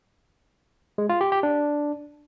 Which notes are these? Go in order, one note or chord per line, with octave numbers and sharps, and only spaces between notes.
G#3
F4
G4
G4
D4